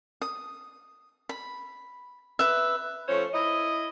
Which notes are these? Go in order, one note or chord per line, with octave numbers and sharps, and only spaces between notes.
D#6
B5
B4 E5
F3 A3 C#4 C5 C#5
E4 D#5